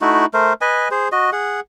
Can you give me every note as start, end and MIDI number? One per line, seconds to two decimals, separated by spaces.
0.01 0.26 57
0.01 0.26 63
0.01 0.26 64
0.01 0.26 66
0.34 0.53 57
0.34 0.53 70
0.34 0.53 72
0.61 0.88 71
0.61 0.88 75
0.61 0.88 80
0.91 1.08 68
0.91 1.08 72
1.12 1.30 66
1.12 1.30 75
1.32 1.60 68
1.32 1.60 78